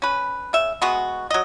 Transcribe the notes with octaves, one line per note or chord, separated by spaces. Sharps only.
C#4 B4
C#3 E5
G#3 B3 F#4
F#3 D#5